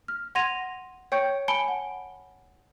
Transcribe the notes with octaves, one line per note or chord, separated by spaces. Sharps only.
F6
F#5 C6 G#6 A#6 D#7 F7
C#5 G5 C#6 G6 C#7
G#5 A5 B5 C#7 D7 G7
F#5